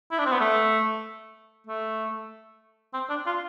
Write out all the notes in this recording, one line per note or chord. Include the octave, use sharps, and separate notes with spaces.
E4
D4
C4
B3
A3
A3
C4
D4
F4